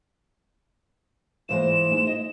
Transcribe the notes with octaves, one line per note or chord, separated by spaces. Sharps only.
G#2 E3 G#3 F4 C5 E7
G#3 D#4
D#5